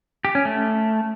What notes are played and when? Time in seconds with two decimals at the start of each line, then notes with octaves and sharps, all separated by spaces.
0.25 G4
0.35 C#4
0.45 A3